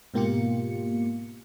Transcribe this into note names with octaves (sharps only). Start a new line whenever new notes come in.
G#2 B2 A#3 F4 G4 C#7